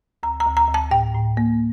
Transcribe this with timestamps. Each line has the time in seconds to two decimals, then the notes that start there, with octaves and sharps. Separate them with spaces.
0.23 D2 A#5
0.40 A#5
0.46 D2
0.57 A#5
0.68 D2
0.74 A5
0.91 A2 G5
1.15 A2
1.37 A#3